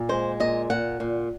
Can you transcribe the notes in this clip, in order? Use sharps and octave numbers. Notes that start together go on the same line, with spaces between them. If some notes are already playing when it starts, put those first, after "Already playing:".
Already playing: A#2
G#3 C5
A#2 D#5
A#2 F#5
A#2